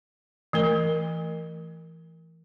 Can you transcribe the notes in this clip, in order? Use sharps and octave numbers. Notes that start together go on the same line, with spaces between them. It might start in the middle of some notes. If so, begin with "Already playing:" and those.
E3 A3 A#4